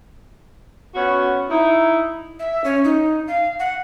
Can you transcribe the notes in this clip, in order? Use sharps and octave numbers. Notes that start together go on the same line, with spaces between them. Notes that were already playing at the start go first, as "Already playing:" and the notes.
B3 C#4 F#4
D#4 E4
E5
C#4
D#4
F5
F#5